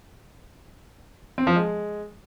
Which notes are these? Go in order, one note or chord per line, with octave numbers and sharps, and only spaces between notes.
C4
F3
G#3